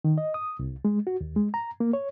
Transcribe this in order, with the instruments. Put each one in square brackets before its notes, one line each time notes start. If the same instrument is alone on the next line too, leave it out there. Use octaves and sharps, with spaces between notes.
[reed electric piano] D#3
D#5
D#6
C2
G#3
F#4
D#2
G#3
A#5
A#3
C#5